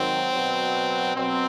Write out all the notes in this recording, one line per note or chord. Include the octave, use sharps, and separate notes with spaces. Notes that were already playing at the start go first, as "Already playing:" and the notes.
Already playing: G#2 D#3 F#3 C4
B2 F#3
B2 F#3 C4